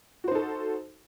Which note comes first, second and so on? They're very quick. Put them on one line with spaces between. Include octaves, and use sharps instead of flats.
F#4 C5 D#4 A4